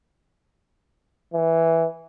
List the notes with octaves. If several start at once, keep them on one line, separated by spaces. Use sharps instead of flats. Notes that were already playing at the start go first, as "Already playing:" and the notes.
E3